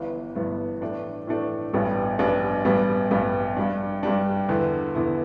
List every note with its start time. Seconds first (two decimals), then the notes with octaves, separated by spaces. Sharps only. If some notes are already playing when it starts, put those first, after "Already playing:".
Already playing: G1 G2 E3 B3
0.35 G1 G2 E3 B3
0.81 A2 E3 A3 D4
1.27 A2 E3 A3 D4
1.73 A1 G2 G3 B3 D4
2.19 A1 G2 G3 B3 D4
2.65 A1 G2 G3 B3
3.11 A1 G2 G3 B3
3.57 G2 G3 D4
4.03 G2 G3 D4
4.49 E2 D3 B3 E4
4.95 E2 D3 B3 E4